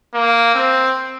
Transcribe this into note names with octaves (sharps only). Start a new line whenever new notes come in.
A#3
C4